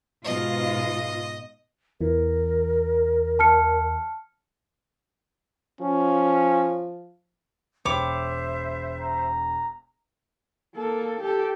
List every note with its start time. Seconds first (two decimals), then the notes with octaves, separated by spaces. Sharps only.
0.25 G#2 B2 F4 D#5
2.01 E2 E3 A#4
3.39 A5 F6 C#7
5.81 F3 C#4
7.85 E1 C5 C#5 E5 G5 B5 D6
9.01 A#5
10.76 A#3 A4
11.21 G4 A4